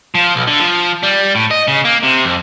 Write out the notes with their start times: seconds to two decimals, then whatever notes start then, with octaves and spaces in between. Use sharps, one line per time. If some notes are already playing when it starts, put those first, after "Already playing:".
0.15 F3
0.36 B1
0.48 D3
0.60 F3
1.03 G3
1.35 A2
1.51 D#5
1.68 C#3
1.85 A#3
2.03 C3
2.25 F2